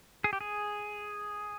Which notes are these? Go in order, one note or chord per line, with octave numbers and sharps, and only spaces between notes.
G#4
G4
G#4